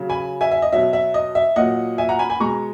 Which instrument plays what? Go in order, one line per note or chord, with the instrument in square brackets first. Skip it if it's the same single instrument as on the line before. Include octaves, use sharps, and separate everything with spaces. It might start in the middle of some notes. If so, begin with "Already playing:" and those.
Already playing: [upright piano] C#3 F#3
G#5 B5
E5 G#5
E5
D#5
B2 F#3 E5
E5
D#5
E5
A#2 F#3 D#5 F#5
E5 G#5
F#5 A#5
G#5 B5
G#5 B5
B2 G#3 A#5 C#6